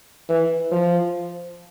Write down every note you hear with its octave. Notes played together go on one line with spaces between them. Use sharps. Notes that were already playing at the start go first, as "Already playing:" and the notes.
E3
F3